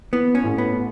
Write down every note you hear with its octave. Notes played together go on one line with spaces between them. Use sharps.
E3 B3
C#4
A1
B3
A2